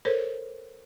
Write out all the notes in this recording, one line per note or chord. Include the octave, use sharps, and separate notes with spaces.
A4 A#4 C5 C#5